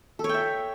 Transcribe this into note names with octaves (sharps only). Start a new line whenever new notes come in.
A4
C#5
G5
E5